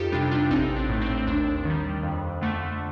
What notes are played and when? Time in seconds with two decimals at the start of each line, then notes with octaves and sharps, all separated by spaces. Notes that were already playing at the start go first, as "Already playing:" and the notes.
Already playing: F2 D#4 F4 G4 A4
0.12 C3 G3 D4 F4
0.31 D4 F4
0.50 A1 C4 D#4
0.76 D4
0.89 A2 A3
1.01 C4
1.18 C4
1.27 D#2 D4
1.65 D#3 G3
2.03 F2
2.41 D3 A3